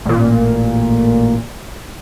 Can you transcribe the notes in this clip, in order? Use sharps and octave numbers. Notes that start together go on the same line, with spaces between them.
A1 A#2